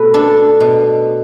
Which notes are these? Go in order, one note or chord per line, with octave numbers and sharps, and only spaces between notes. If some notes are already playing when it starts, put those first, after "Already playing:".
Already playing: B2 A3 B4
D4 A4
B2